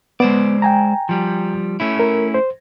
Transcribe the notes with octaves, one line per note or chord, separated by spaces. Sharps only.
G#3 B3 C5 D5
G5 G#5 A#5
F3 G3
A3 C#4 E4
A#4
C5